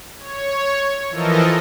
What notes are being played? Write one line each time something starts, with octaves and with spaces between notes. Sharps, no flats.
C#5
E3 F3 A4 A#4 D#5